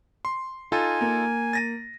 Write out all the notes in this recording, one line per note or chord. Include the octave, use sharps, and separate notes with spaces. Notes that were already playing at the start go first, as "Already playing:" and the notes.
C6
D#4 F4 A4 G#5
A#3
A6 A#6 D#7